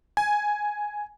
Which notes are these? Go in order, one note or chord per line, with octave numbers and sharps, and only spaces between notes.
G#5